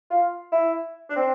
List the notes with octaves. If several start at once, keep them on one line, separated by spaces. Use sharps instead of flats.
F4
E4
D4
C4